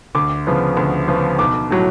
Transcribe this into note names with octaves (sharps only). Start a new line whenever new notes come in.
D2 D6
C#3 F3 B3
D2
C#3 F3 B3
B1 D6
A2 F#3